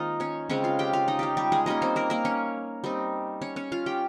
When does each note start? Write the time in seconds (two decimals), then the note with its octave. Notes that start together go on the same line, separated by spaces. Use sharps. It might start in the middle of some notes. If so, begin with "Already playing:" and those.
Already playing: D#3 G#3 A#3 C4 D#4 F4 D#5 F5
0.20 C#4 C#5
0.49 C#3 G#3 C4 C#4 C#5
0.64 F4 F5
0.79 G4 G5
0.93 F4 F5
1.08 D#4 D#5
1.19 F4 G4
1.37 G3 G4
1.52 G#3 G#4
1.66 G3 A#3 C#4 D#4 D#5
1.82 C4 C5
1.96 A#3 A#4
2.10 A#3 A#4
2.25 C#4 C#5
2.84 G3 C4 D#4
3.42 C#4 C#5
3.56 C#4 C#5
3.72 F4 F5
3.86 G4 G5